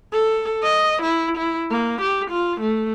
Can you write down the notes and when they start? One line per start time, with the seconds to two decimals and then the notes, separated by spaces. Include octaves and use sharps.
0.13 A4
0.63 D#5
1.03 E4
1.38 E4
1.71 A#3
2.01 G4
2.31 F4
2.61 A3